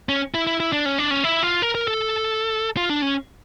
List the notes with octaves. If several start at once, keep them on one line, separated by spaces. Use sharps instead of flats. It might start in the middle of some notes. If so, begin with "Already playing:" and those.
C#4
E4
E4
E4
D4
C#4
D4
C#4
E4
F4
A#4
A#4
A4
F4
D4
C#4